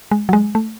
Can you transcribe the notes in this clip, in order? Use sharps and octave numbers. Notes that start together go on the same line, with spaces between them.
G#3
F#3
G#3
A3